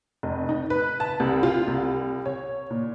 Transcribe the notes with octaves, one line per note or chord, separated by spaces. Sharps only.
F1
D#4
B4
A5
C2
F4
C2
C#5
A#2